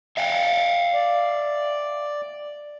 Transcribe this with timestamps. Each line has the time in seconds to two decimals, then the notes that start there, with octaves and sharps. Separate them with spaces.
0.17 E5 F5 G5
0.94 D5